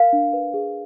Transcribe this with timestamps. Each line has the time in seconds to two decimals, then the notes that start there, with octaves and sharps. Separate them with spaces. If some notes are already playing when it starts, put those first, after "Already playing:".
Already playing: A#4 F5
0.13 D4
0.33 B4
0.54 G#4